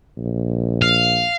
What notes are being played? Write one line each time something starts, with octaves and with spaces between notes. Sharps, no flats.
A#1
F5